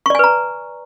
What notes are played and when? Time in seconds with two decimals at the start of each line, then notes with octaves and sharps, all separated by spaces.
0.06 C#6
0.10 D5
0.15 G#5
0.19 B4
0.24 A#5